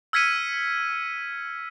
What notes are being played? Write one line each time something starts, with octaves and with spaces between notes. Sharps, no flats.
E6 F6 G#6 B6 C#7 D#7